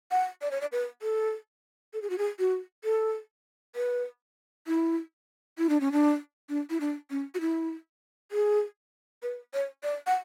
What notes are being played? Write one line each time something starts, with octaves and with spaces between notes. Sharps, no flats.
F#5
D5
C#5
D5
B4
A4
A4
G#4
F#4
G#4
F#4
A4
B4
E4
E4
D4
C#4
D4
D4
E4
D4
C#4
F#4
E4
G#4
B4
C#5
D5
F#5